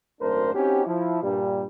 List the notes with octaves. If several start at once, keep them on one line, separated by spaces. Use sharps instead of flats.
G#1 F#2 A3 D4 A#4 C5
C4 C#4 D#4 F#4 G4
F3 E4
G2 A#2 G3